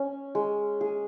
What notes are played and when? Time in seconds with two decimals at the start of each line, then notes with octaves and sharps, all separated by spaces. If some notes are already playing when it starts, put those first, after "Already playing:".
Already playing: C#4
0.35 G#3
0.81 G#4